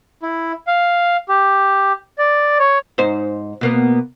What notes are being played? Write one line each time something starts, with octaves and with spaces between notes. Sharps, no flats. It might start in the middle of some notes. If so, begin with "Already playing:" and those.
E4
F5
G4
D5
C#5
G#2 D#4 C5
B2 A#3 B3